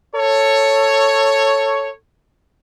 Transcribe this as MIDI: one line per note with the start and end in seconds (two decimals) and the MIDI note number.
0.15 1.88 69
0.15 1.88 73